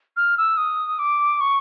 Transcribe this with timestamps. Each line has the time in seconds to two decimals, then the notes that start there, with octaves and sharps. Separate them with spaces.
0.17 F6
0.38 E6
0.57 D#6
0.99 D6
1.41 C#6